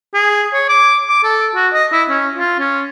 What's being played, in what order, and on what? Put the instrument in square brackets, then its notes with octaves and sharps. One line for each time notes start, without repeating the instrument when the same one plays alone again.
[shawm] G#4
C#5
D6
D6
A4
F#4
D#5
E4
C#4
F4
C#4